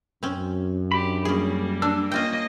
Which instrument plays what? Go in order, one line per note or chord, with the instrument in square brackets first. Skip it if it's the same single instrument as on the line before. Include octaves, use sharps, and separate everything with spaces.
[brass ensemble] F#2 [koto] C4 C#4
[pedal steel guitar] D4 B5 [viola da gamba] G4
[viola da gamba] G3 A#3 [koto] C#4 G#4
[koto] D4 [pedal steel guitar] E6
[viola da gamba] A#3 D#5 [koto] C#4 F4 G5